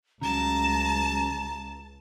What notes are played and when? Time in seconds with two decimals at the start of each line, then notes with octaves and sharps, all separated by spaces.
0.21 C#2 C#3 F#3 G3 A5 A#5